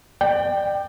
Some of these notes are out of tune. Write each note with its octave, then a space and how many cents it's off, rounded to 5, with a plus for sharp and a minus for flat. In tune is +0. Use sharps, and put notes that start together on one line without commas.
D5 +30 G5 +0